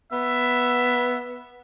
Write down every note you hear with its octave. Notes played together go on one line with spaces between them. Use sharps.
B3 E5